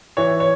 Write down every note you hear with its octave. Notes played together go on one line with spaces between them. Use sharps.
E3 C#5
C#5